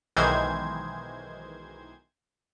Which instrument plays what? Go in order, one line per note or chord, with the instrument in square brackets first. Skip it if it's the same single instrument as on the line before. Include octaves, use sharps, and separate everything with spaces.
[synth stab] B1 D#3 E3 G#3 C5 G#6